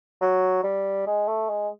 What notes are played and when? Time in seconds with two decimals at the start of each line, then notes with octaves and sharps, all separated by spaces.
0.21 F#3
0.63 G3
1.07 G#3
1.27 A3
1.49 G#3